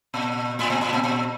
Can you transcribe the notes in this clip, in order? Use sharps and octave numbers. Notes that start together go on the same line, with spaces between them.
A#2
A2
A#2
A2
A#2
A#2